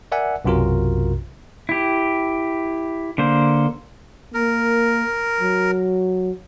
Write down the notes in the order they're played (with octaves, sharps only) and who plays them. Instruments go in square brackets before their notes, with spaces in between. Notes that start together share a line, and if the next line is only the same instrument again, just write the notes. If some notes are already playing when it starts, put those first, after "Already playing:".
[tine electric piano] A#4 D5 E5 F#5 G#5
B1 F#2 C3 F4 F#4 A#4
[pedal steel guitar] E4 G4
D3 A#3 C5
[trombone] A#3 [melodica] A#4
[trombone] F#3